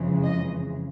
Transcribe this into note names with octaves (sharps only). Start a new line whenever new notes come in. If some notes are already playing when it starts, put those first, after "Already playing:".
Already playing: F2 C#3 E3 G#3
D#5